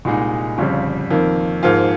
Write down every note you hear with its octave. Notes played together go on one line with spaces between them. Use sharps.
C2 A#2 G#3 D#4
G1 F2 C#3 G3
F2 D#3 A#3
G#2 F3 A#3 F4